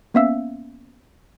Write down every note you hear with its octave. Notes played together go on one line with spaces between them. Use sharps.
A#3 B3 C#4 E5 F5 E6